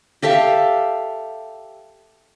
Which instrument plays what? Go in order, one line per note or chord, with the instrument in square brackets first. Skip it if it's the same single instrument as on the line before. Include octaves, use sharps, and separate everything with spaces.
[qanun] G4 A4 E5 F5